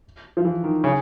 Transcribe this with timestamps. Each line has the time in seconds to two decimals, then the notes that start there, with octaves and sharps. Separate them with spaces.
0.37 F3
0.45 E3
0.64 D#3
0.84 C#3